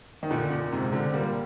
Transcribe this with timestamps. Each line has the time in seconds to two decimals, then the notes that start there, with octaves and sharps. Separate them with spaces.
0.23 D#3
0.31 A#2 D3
0.51 A#2
0.72 G#2 C3
0.93 A#2 D3
1.13 G3 A#3